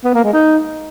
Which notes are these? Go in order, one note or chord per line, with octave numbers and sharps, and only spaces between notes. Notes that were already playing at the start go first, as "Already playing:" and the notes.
B3
A#3
G#3
D#4